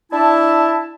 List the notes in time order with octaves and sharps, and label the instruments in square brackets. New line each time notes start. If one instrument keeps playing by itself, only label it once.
[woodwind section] D4 E4 E5 A5